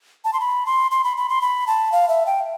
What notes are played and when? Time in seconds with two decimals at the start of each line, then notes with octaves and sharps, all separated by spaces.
0.25 A5
0.33 C6
0.40 B5
0.66 C6
0.91 C6
1.04 B5
1.17 B5
1.29 C6
1.41 B5
1.67 A5
1.92 F5
2.09 E5
2.26 G5